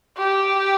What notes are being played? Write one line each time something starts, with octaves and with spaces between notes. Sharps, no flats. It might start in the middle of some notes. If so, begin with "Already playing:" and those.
G4